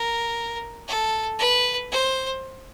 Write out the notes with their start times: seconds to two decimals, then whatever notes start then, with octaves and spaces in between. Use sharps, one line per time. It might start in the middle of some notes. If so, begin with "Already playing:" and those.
Already playing: A#4
0.88 A4
1.39 B4
1.91 C5